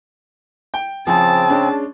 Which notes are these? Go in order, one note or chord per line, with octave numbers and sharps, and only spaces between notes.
G5
C#3 F3 C4 G#5 A5
G#3 C#4 D4